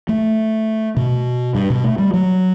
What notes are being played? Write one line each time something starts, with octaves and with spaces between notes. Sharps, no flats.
A3
B2
G2
B2
A3
G3
F#3